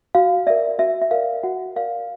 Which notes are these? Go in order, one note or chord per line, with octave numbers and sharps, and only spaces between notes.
F#4 F5
A#4 D5 E5
F#4 E5
E5
A#4 D5 F5
F#4 F#5
A#4 D5 F5